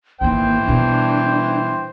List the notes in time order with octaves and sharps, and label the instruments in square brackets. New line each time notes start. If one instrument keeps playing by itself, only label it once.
[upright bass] G#1 D4 [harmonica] E3 C5 G5 [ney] A#3
[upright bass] B2 G3 [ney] D4